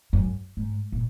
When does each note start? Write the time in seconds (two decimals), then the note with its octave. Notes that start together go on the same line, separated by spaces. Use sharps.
0.13 F#2
0.57 G#2
0.92 A#2